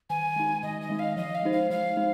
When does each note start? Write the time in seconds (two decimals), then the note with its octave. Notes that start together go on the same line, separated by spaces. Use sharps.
0.10 D#3 G#5
0.36 G#3 D#4
0.63 D#3 D#5
0.81 D#5
0.90 G#3 D#4
0.99 F5
1.16 F3 D#5
1.35 F5
1.43 G#3 D#4 C5
1.52 F5
1.70 F3 F5
1.97 G#3 D#4 C5